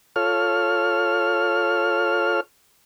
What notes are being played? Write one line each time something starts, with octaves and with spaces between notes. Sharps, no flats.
F4 A4 C#5 F6